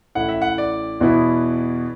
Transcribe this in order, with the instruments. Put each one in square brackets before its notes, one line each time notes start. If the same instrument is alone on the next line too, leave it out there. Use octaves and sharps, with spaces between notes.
[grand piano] A1 A2 A3 E4 F#5
E5
F#5
D5
E2 B2 B3 E4